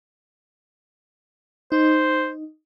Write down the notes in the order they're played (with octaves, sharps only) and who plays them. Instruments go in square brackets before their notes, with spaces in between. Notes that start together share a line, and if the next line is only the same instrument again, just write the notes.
[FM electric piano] D#4 [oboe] C5